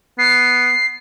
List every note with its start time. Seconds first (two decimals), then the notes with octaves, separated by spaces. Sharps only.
0.19 B3 C7